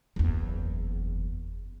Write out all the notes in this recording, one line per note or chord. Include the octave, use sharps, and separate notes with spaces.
F#1 E2